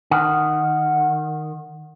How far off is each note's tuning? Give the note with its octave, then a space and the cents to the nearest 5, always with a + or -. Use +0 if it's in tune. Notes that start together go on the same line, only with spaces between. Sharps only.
D#3 -10 F#5 +0